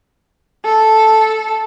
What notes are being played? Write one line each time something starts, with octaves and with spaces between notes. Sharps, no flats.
A4